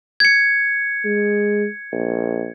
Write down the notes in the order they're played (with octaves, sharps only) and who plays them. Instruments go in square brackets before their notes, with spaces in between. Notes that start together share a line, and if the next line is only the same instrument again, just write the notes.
[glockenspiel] G#6 C#7
[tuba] G#3
A#1